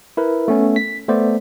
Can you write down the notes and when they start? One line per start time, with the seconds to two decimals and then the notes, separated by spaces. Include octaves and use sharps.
0.17 E4 A#4 B4
0.48 A3 B3 C#4
0.76 B6
1.08 A3 B3 C5 D5